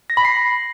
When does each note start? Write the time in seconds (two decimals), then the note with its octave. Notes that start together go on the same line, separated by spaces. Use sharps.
0.10 A#6
0.17 B5
0.25 C7